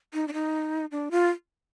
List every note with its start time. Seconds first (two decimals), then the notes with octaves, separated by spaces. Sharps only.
0.14 D#4
0.28 D4
0.33 D#4
0.91 D4
1.11 F4